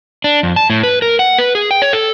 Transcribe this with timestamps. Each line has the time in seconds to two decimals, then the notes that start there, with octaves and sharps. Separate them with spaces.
0.24 D4
0.43 F2
0.56 A5
0.70 A2
0.83 B4
1.02 A#4
1.19 F#5
1.38 B4
1.55 G#4
1.71 G5
1.82 C#5
1.93 A4